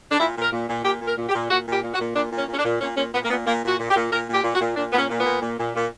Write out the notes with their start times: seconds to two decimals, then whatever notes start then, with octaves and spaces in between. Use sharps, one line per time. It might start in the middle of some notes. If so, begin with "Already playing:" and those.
0.12 D4
0.20 A#2 E4
0.37 A#2
0.42 A#4
0.52 A#2
0.69 A#2
0.84 A#2 G4
1.01 A#2
1.07 A#4
1.17 A#2
1.29 G4
1.34 A#2
1.50 A#2 F#4
1.66 A#2
1.73 G4
1.83 A#2
1.94 F#4
2.00 A#2
2.16 A#2 D4
2.31 A#2
2.37 C#4
2.48 A#2
2.54 C#4
2.59 D4
2.65 A#2
2.80 A#2 C#4
2.97 A#2 C#4
3.13 A#2 B3
3.24 A#3
3.30 A#2 B3
3.46 A#2 A#3
3.63 A#2 F#4
3.79 A#2
3.90 G4
3.95 A#2
4.11 A#2 A#4
4.28 A#2
4.34 G4
4.44 A#2
4.55 F#4
4.60 A#2
4.76 A#2 D4
4.93 A#2 B3
4.98 C#4
5.10 A#2
5.20 B3
5.26 A#2
5.42 A#2
5.59 A#2
5.75 A#2